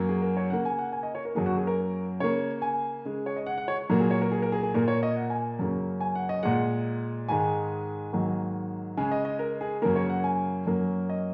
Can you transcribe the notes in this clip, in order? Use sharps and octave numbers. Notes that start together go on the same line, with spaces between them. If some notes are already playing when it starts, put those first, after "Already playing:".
Already playing: F#2 F#3 A#3
G#4
A#4
C#5
C#3 A#3 F#5
G#5
F#5
G#5
D#5
C#5
A#4
F#2 F#3 A#3 G#4
F#4
G#4
A#4
C#3 A#3 C#5
G#5
C#3 G#3
C#5
D#5
F#5
F#5
C#5
A#2 F#3 A#3
G#4
C#5
A#4
G#4
A#4
G#4
G#4
A#2 A#3 A#4
C#5
D#5
F#5
G#5
F#2 C#3 A#3
G#5
F#5
D#5
A#2 G#3 F#5
G#2 D#3 G#3 G#5
G#2 D#3 F#3 A#3
C#3 G#3 G#5
D#5
D#5
A#4
G#4
F#2 C#3 A#3 A#4
C#5
F#5
G#5
F#2 F#3 A#3
D#5